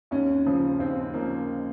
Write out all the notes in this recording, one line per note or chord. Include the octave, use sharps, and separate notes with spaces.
D#2 C#4
C#3 F3
D#2 C4
C#3 F3 A#3